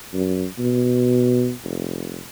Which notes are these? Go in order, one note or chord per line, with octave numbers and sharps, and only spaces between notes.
F#2
B2
F1